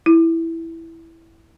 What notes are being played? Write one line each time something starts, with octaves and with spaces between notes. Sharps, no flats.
E4